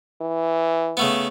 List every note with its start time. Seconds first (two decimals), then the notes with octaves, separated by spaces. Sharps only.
0.21 E3
0.97 C#3 A3 B3